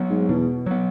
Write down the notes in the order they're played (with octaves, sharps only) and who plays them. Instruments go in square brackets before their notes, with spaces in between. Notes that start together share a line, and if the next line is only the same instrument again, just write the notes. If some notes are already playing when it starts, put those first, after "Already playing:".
Already playing: [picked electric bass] F#3 B3
[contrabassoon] G#2
[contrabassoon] E2 [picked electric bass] B2
[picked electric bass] F#3 B3